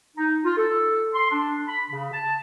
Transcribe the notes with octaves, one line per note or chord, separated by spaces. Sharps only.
D#4
F4
A4
C6
D4
B5
C#3
A5